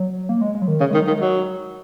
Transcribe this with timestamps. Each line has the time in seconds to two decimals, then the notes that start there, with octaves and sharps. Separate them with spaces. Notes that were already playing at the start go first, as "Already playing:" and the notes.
Already playing: F#3
0.29 A#3
0.41 G#3
0.55 G#3
0.62 F#3
0.68 D#3
0.80 C#3
0.91 D#3 G#3
1.01 F#3
1.07 D#3
1.11 G#3
1.21 F#3